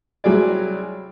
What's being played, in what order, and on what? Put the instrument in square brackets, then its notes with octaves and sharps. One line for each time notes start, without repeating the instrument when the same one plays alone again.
[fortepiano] C2 F#3 G#4 D5